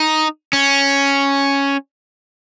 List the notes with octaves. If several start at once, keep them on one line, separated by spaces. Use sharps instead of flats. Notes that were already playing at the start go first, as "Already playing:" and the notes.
Already playing: D#4
C#4